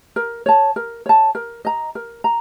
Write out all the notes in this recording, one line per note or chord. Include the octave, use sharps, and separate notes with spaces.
A#4
C#5 A5
A#4
C#5 A5
A#4
D#5 A#5
A#4
A#5